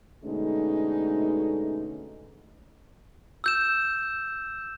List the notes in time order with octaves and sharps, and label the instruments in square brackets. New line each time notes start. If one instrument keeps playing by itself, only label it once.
[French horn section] B2 D3 G#3 A3 C#4 D#4
[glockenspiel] E6 G6 E7